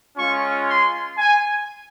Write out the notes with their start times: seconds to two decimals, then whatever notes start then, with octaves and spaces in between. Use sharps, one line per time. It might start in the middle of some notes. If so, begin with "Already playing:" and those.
0.17 G#3 C#4 F4 C#6
0.67 C6
1.18 G#5